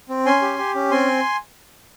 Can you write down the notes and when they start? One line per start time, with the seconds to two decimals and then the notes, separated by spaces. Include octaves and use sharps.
0.09 C4
0.25 C#4 G#5 C6
0.42 G4
0.58 G4
0.75 C#4
0.91 C4 G#5 C6